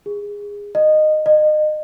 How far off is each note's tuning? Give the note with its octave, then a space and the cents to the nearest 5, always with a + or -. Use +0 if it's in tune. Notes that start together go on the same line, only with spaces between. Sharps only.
G#4 -20
D#5 -15
D#5 -30